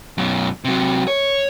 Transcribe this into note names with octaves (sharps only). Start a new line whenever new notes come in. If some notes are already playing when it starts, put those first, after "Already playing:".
F#2 B2
C3 F#3
C#5